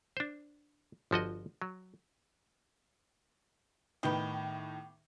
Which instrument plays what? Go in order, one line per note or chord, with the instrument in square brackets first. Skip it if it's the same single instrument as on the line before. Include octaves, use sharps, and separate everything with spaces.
[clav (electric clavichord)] D4 C5
G1 F3 F#4 D#5
F#3
[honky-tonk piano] A2 D#3 D#4 [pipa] B3 G4